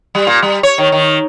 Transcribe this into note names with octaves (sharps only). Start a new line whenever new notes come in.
G3
A#2
G3
C#5
D#3
D#3